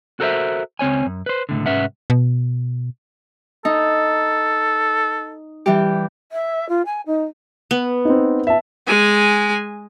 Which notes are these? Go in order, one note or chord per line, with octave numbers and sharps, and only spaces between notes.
F#4 A4 A#4 C5 D#5 E5
C#2 C4 C#5 G#5
F#2
B4 C5
C#2 A2 D3
C2 G#2 C#4 B4 E5 F#5
B2
D#4 A4
E3 G3 G4
E5
F4
G#5
D#4
B3
C4 D#4
E5 A5
G#3 G#5